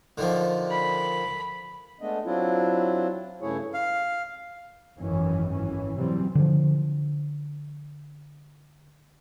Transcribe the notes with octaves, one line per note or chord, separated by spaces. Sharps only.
D3 D#3 F3
B5
G#3 A3 B3 D4 D#5
F#3 C4 D4 E4 F4
G2 C#3 A3 E4 G#4 C#5
F5
G#1 F#2 D#3 E3 C#4
G#1 E3 C#4
C3 E3 F#3 G3 C4
D3 F3